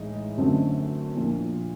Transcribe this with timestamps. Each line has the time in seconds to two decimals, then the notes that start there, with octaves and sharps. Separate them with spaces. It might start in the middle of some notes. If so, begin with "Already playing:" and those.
Already playing: A2 E3 G#3 D#4
0.38 F#2 D3 F#3 A3 C4
1.16 A#2 F3 A#3 D4